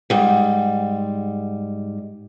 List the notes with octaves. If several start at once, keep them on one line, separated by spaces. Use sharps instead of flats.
G#2 G3